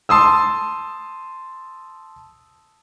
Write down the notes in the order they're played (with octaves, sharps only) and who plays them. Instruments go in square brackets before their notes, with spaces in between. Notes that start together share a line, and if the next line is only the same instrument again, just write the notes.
[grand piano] A5 C6 D#6 E6